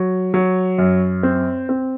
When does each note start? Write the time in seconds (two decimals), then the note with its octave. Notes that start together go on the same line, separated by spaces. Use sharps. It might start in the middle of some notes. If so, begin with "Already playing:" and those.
Already playing: F#3
0.34 F#3
0.78 F#2
1.23 C4
1.69 C4